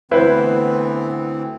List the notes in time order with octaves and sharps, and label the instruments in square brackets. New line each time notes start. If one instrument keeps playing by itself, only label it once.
[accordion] D2 E3 C4 [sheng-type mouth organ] B3 [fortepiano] E4 B4 C5